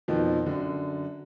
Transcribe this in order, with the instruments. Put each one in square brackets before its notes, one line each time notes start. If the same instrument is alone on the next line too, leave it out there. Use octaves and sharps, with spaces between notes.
[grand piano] F2 B2 D#3 F3
F#2 D3